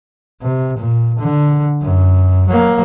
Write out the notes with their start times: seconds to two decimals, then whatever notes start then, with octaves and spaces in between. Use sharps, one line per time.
0.41 C3
0.78 A#2
1.19 D3
1.83 F#2
2.48 F#3 A#3